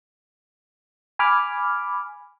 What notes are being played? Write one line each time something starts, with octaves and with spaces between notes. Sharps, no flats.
G#5 B5 D6 F6